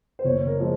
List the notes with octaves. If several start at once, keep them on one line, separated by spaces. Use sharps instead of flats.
C5
F#1 C#5
A#4
F3 G#3